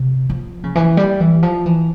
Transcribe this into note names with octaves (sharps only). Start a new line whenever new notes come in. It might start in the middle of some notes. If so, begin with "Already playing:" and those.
Already playing: C3
F3
C#3
E3
G3
E3
F3
E3